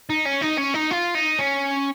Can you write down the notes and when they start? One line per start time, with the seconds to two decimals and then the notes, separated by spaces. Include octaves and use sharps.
0.10 D#4
0.26 C#4
0.42 D#4
0.58 C#4
0.74 D#4
0.90 F4
1.15 D#4
1.39 C#4